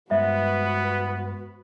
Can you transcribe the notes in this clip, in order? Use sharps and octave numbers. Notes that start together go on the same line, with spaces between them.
G2 G#3 B3 F#4 B4 C5 E5